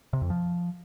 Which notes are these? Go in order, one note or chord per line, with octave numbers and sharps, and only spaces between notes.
C3
F2
F3